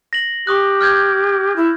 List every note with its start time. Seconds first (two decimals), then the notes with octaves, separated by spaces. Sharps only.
0.13 A#6 F#7
0.47 G4 C#6 D#6 F#6
0.81 F6 G6 G#6
1.56 E4